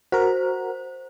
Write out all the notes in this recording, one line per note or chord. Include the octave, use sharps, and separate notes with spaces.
F#4 A#4 C5